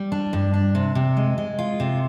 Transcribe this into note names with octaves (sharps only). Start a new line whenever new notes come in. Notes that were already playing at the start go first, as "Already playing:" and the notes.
Already playing: G3
D4
G2
D4
C3
C3
G#3
G#3
F4
C3